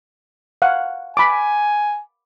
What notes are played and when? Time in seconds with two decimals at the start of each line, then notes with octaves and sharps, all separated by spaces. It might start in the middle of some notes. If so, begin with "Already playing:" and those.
0.62 F5 F#5
1.17 G#5 B5 D6